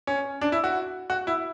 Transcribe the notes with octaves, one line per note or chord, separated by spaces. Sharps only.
C#4
D4
E4
F#4
F#4
E4